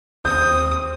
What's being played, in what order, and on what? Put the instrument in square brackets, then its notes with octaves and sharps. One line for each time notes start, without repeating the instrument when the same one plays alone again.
[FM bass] D#2 [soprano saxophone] C4 [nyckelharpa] D#6 [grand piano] G6